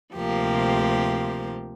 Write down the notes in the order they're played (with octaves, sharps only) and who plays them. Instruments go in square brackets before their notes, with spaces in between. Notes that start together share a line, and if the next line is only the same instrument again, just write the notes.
[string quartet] D2 C3 F3 A#3 G4